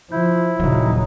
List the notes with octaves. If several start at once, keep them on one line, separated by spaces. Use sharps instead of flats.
F3 E4 G6
D#1 A#1 C#3 F#3 D#4